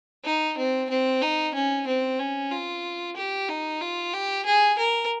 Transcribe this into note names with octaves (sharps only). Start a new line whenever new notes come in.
D#4
C4
C4
D#4
C#4
C4
C#4
F4
G4
D#4
F4
G4
G#4
A#4